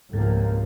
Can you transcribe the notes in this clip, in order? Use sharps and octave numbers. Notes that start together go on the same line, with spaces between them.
C#2 G#2 C3 F3 A#3